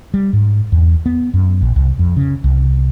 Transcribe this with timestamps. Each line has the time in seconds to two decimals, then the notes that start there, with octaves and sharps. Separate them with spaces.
0.14 G3
0.33 G#2
0.72 E2
1.06 B3
1.34 F#2
1.62 A#1
1.76 C2
1.99 F2
2.17 C#3
2.44 C2